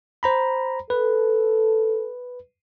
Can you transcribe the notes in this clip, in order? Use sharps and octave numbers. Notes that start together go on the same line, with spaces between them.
C5 A#5 B5
A4 B4